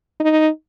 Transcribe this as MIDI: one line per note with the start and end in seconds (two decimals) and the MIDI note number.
0.20 0.49 63